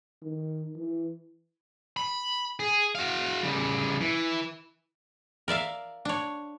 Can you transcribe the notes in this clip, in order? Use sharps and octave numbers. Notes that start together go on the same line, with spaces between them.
D#3
E3
B5
G#4
F#4 F5
C#3 G3
E3
A#4 D5 E5 F5
D4 C#5